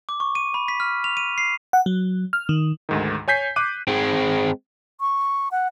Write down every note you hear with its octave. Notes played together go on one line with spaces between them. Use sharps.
D6
C#6
D#7
B5
B6
F6
F7
D#7
C7
F#5
F#3
F6
D#3
D2 G#2 D#3
C#5 G#5 G6 B6 C7
D6 F#6 D#7
G#3 C4
C#6
F#5